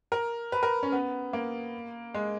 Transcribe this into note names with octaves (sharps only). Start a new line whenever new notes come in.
A#4
B4
A#4
C#4
B3
A#3
G#3